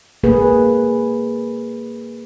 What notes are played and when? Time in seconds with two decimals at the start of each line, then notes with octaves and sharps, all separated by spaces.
0.24 A#3 G#4 B4